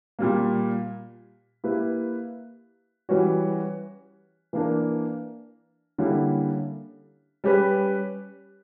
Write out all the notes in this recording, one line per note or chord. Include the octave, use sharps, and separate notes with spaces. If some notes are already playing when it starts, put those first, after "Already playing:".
A#2 G3 A#3
A#3 E4 G4 B4
E3 G3 C#4 F#4 C#5
E3 A#3 D4 A#4
D3 G3 A#3 C#4 E4
G3 C#4 G4 B4